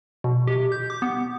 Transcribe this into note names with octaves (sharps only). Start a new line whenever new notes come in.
B2
G4
G6
D6
B3